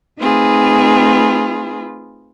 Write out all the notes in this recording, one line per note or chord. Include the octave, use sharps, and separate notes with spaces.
A3 C4 D#4 F4 G#4 B4